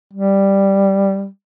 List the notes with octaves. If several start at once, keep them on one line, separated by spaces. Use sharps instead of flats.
G3